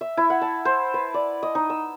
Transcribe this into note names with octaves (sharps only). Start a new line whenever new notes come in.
E5
E4
F#5
A5
C5
B4
D5
D#5
D#4
E6